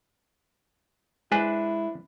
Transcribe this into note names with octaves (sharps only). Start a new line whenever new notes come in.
G#3 D4 E4 B4 C5 G#5